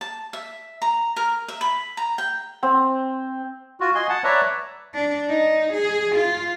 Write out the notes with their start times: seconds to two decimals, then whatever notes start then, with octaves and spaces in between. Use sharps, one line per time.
0.01 A5
0.33 E5
0.82 A#5
1.16 A#4
1.48 E5
1.61 B5
1.97 A#5
2.18 G5
2.63 C4
3.80 F4 F#4
3.95 D#5 G#5 C6
4.09 F#5 A5
4.24 B4 C#5 D5 E5 A5 A#5
4.94 D4
5.29 D#4
5.74 G#4
6.16 F4